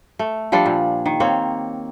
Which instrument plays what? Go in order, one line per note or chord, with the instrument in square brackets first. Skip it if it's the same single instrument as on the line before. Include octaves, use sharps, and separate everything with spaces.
[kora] A3
F3 G3 D4 A4
A#2
D#3
A#3 C4 C#5